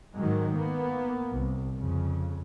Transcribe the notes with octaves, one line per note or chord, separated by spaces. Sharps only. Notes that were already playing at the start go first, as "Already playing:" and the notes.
G#2 D#3 F#3 G#3
A#3 B3
C2
F2 C#3